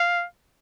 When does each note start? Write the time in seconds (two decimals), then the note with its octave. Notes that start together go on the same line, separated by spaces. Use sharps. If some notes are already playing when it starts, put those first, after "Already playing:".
Already playing: F5